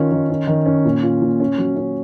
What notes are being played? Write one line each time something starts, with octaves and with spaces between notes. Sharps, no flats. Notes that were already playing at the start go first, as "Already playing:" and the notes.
Already playing: D#3 C#4 F4
D#3
C#4
D#3
C#4
A#2
F4
A#2
C#4
F#3
C#4